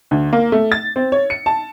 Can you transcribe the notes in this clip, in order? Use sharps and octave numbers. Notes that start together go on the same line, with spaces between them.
D2
A#3
A3
A6
C4
C#5
C#7
A5